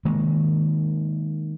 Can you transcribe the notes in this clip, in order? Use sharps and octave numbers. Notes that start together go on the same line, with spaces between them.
D#3 G#3 A#3